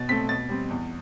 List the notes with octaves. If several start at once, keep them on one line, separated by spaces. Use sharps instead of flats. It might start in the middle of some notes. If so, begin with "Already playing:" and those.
Already playing: B2 A6
A3 C4 B6
B2 A6
G3 C4
E2